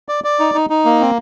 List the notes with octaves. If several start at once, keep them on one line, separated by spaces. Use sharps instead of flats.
D5
D5
D#4
D#4
D#4
A#3
C4